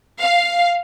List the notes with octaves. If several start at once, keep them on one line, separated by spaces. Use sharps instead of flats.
F5